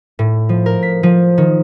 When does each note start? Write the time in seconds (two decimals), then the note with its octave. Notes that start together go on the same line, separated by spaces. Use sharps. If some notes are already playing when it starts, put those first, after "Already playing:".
0.19 A2
0.49 F3
0.66 A#4
0.83 B6
1.03 F3
1.38 D#3